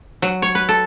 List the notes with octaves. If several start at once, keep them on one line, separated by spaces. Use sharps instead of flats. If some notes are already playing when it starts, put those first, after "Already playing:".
F#3
C#5
B4
A4